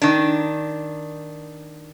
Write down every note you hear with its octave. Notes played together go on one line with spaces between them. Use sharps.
D#3 D4